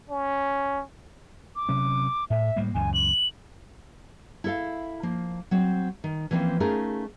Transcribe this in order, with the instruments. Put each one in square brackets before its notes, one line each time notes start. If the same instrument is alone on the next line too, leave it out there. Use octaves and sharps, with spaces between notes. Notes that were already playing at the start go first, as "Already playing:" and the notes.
[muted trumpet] C#4
[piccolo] D6
[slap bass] C3 F#3 C#4
[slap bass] A2 [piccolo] E5
[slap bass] A2 G3 A#3
[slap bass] C#2 F#2 A#2 [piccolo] G#5
[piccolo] F#7
[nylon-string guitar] E4 A4 F5
F3 A#3
F#3 C4
D#3
E3 F3 A#3 C4 C#4
A3 C#4 D#4 F4 G#4 A#4